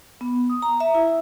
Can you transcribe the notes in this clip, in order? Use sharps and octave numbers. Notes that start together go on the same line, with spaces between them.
B3
D#6
A#5
E5
E4